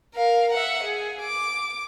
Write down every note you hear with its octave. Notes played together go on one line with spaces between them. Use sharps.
A#4 F5
E5 F#5
G#4
D6